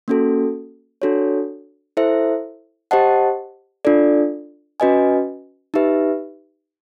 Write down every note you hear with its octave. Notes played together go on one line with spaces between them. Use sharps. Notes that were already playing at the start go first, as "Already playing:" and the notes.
A#3 C#4 F#4 A4
D4 F#4 A4 C#5
E4 A4 C5 E5
G4 C5 D#5 F#5 A5
D4 F4 A4 D5
C#4 F#4 B4 D#5 G#5
D#4 G4 B4 E5